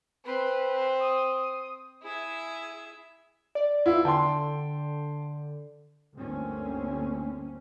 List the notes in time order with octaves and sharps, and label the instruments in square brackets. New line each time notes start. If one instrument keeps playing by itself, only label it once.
[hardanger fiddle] C4 [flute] B4
[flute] D#6
[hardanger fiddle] E4 E5 [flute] G#4
[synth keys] D5
[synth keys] E2 [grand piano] E4 F4
[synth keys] D3 [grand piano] G5 A5 C6
[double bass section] G1 D2 A#3 C4 C#4